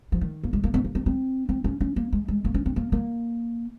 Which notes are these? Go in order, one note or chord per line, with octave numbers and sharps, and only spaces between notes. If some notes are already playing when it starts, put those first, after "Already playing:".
F3
D#3
A#3
G#3
A#3
C4
A#3
C4
C4
C4
C#4
C#4
A#3
G#3
G#3
A#3
C#4
C4
A#3
A#3